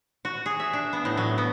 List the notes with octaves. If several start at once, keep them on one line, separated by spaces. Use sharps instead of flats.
F#4
G#4
E5
D4
B3
A2
F#3
B3